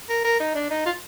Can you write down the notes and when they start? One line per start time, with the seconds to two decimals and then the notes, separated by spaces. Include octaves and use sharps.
0.09 A#4
0.24 A#4
0.40 D#4
0.55 D4
0.70 D#4
0.86 F4